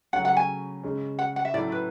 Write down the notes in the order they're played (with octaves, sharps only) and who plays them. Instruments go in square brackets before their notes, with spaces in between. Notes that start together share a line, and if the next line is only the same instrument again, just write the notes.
[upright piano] C#3 F#3 A3 C#4 [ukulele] F#5
[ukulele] F#5
G#5
[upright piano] C#3 G#3 C#4
[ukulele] F#5
F#5
E5
[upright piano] A2 F#3 A3 C#4 E4 [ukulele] D5
[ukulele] B4